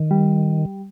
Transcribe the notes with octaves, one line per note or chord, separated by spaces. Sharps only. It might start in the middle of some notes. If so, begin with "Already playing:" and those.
Already playing: D#3
G3